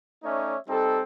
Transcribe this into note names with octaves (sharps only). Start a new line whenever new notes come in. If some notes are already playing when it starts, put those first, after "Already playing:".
A3 C#4 D#4 C#5 D5 E5
G3 C4 D#4 A4